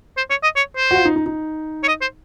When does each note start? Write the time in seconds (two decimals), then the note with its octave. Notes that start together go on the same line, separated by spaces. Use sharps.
0.17 C5
0.30 C#5
0.43 D#5
0.56 C#5
0.77 C5
0.91 F#4
0.96 F4
1.05 D#4
1.16 D#4
1.26 D#4
1.83 C#5
1.88 D#5
2.01 C5